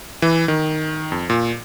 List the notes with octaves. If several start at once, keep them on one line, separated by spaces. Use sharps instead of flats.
E3
D#3
F2
A#2